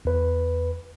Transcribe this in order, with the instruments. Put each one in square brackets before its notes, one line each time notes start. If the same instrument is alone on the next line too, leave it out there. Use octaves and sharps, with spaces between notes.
[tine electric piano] E2 B4